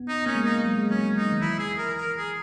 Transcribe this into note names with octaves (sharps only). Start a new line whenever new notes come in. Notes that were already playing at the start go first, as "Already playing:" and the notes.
Already playing: B3
D#4
A#3 C#4
G#3
A#3 D#4
F#3
G#3
F#3 C#4
D#4
D#3
E3 E4
G#4
A#4
A#4
G#4